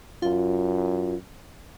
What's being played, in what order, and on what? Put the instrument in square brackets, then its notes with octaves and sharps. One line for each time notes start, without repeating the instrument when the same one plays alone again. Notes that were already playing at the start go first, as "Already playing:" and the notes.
[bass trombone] F#2 [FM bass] F4